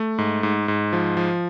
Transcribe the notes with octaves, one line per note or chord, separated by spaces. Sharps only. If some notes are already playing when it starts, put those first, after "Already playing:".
Already playing: A3
G#2
G#2
G#2
F3
F3